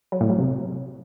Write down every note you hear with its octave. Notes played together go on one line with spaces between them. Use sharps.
F#3
A2
F#3
C3